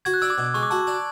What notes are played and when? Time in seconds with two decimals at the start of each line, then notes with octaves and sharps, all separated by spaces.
0.05 F#4 G#6
0.14 F#6
0.22 D4 E6
0.30 D6
0.38 B2
0.54 G#3 C#6
0.63 D6
0.70 F#4 A5
0.87 D4